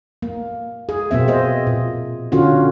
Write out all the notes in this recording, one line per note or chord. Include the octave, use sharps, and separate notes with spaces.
A#3
G#4
B2 A#3 C4 E5
G#4 C5 D#5
A#2
D3 C#4 F4 F#4